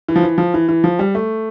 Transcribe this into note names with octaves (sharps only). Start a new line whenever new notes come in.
E3
F3
E3
F3
E3
E3
F3
G3
A3